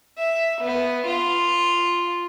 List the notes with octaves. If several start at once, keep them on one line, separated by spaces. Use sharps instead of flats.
E5
B3
F4